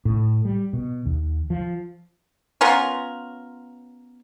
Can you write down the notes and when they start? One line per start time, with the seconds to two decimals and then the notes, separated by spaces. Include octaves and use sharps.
0.05 A2
0.45 G3
0.73 B2
1.06 D#2
1.50 F3
2.61 B3 C#4 F4 A#4